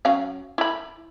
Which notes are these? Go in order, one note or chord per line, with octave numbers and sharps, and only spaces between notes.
F#3 C#4 F5
E4 B5